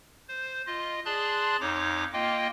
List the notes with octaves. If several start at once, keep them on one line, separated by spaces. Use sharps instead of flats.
C5
F4 D#5
G#4 D5 A5 C6 F#6
F2 D#4 C#5 D6
A#3 F4 D#5 G5